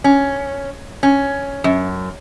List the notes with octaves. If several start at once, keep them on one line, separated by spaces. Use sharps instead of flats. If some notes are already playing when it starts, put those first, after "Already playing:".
C#4
C#4
F#2